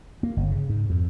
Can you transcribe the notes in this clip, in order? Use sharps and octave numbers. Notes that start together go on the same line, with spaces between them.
A#3
G1
C#3
G#2
F2